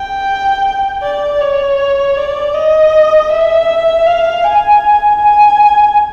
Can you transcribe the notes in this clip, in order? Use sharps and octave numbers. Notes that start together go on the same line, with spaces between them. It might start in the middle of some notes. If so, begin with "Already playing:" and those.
Already playing: G5
D5
C#5
D5
D#5
E5
F5
G#5
G#5